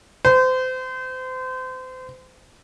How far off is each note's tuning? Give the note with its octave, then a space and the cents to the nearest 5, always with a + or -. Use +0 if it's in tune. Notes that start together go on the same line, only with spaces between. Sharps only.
C5 -30